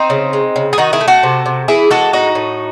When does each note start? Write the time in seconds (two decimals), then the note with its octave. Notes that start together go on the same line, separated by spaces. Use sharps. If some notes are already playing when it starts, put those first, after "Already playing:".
Already playing: C4 D#4
0.10 C#3
0.33 G#3
0.56 C#3
0.73 G#4
0.78 D#3 D#4 F#4
0.93 E4 G#4
1.01 A3
1.08 F#4 A4
1.23 C3
1.46 C3
1.68 E3 E4 G#4
1.90 G#3 F#4 A4
2.13 A2 D#4 F#4
2.35 A2